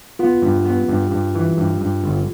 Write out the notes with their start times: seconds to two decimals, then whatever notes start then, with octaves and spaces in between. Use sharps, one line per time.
0.19 B3 F4
0.42 G2
0.65 B3
0.89 G2
1.11 G2
1.35 E3
1.57 G2
1.81 G2
2.04 G1